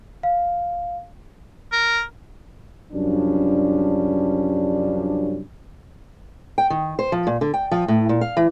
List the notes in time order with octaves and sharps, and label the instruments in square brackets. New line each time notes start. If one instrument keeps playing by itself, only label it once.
[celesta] F5
[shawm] A#4
[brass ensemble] C2 F#2 F3 G3 C#4 D4
[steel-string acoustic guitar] G5
D#3
C5
F3
A#2
D3
G5
F3
A2
A#2
F5
E3